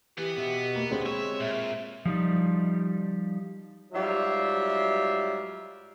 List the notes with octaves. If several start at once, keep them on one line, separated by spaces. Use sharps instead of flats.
E3 B3 G4
B2 E5
A#3
D2 G#3 C4
C#5 E5
A#2 E5
F3 G3 D#4
G#2 F#3 G3 F4 E5